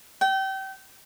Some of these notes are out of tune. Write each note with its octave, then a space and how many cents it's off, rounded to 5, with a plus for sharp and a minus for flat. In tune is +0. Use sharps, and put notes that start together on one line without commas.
G5 -30